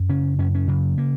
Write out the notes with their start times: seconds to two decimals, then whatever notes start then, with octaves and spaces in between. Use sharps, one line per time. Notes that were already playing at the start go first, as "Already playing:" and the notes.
Already playing: F#2
0.09 C#3 C#4
0.38 F#2 C#4
0.55 C#4
0.68 C#3 F#3
0.98 A#3